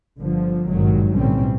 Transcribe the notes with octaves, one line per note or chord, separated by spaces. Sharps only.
G1 D3 F3
G#1 G2 A#2 D#3 F#3
B1 A2 D3 G3 C4 C#4